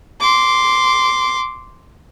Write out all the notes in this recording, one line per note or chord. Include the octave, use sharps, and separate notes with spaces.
C6 D6